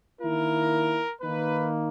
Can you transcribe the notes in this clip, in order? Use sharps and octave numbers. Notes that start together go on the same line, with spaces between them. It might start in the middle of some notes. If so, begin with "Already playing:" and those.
D#3 A#3 E4 A#4
D#3 A#3 D#4 B4